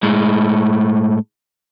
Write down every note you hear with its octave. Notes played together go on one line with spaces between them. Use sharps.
A2 G#3